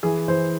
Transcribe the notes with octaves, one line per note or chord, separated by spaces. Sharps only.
E3 G#4
E3 C5